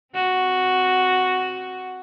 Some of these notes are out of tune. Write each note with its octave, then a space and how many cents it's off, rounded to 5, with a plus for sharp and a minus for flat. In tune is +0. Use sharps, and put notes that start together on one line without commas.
C4 +0 F#4 +0